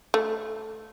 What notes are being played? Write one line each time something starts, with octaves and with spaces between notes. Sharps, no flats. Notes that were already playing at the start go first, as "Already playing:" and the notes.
A3